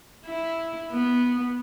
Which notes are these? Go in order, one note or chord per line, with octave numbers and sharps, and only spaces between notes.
E4
B3